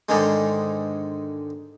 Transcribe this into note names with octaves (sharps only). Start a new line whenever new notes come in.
G#2 D3 D#3 G#3